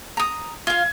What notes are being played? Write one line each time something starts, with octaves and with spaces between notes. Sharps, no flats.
A#5 D#6
F4 F5 G#6